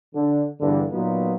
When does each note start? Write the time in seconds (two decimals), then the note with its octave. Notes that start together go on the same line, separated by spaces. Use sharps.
0.14 D3
0.60 E2 G2 D3
0.92 A#2 F#3 B3 D#4 F4